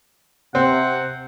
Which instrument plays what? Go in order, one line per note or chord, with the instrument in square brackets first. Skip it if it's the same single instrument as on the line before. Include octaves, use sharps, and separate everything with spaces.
[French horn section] C3 [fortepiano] C4 [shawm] F#5